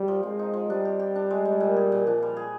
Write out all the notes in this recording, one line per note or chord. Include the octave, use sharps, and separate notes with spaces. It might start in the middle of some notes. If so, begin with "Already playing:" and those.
Already playing: G3
F3
G#3 C4
D#4
F3
G3 D4
G4
G4
D4
G#3
G#3
A#2
G#4
A#2
F3 D4
G3
G#4